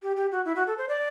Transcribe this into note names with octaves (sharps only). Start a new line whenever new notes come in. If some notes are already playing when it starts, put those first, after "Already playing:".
G4
G4
F#4
E4
F#4
A4
C5
D5